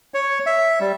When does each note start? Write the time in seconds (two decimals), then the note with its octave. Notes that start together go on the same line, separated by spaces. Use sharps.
0.14 C#5
0.46 E5
0.80 G3